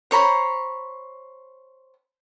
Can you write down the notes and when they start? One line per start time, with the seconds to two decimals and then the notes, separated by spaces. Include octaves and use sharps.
0.11 C5 C#5 A#5 B5